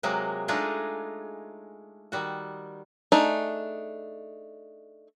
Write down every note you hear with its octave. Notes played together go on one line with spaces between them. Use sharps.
C3 F#3 G#3 A#3
G#3 A3 D4 D#4 F4 G#4
D#3 G3 F#4
A3 D4 D#4 G#4